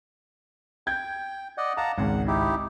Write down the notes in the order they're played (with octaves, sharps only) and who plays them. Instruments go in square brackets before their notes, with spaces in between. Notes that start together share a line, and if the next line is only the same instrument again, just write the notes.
[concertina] G5 [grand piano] G6 G#6
[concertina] D5 D#5 F#5
[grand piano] F5 [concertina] F#5 A5 A#5
[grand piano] G#1 C#2 [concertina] F#5
[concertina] D#4 E4 G4